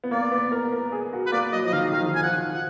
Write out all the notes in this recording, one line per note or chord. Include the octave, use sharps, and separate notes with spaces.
B3
A#3 D5
B3
A#4
A#4
G#4
F#4
B4
A#3 D5
F#3 D#5
F3 D#5
D#3 F5
D#3 F5
F3
D#3
G#5
F3 F#5
F#5